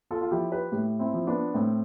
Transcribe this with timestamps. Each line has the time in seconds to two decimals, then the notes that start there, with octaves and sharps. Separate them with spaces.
0.11 F4 A4
0.21 F4
0.31 F3 E4 G4
0.52 G4 B4
0.72 A2 E4 G4
0.99 C4 E4
1.13 F3
1.27 B3 D4
1.54 A2 C4